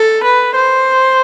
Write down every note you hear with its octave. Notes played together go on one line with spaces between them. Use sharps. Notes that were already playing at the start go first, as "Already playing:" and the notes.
Already playing: A4
B4
C5